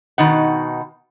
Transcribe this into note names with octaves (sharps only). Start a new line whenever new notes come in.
B2 D#3 D#4 F#5